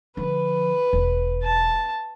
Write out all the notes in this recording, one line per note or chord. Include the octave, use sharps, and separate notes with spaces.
D3 F3 B4
E1
A5